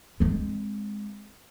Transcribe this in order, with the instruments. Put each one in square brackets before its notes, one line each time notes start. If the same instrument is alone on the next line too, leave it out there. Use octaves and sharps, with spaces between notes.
[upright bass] G#3 C4